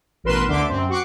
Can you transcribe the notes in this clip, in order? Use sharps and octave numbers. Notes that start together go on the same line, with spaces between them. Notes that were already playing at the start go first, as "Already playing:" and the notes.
A1 B2 A#4 B4 C6 E7
D2 D3 E5 C6 D6
F#2 C4
F#4 F#5 C#6 D6 C7